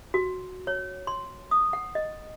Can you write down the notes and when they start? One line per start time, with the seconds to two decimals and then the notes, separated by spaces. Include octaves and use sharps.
0.14 F#4
0.67 C#5
1.07 C6
1.51 D#6
1.73 F#5
1.95 D#5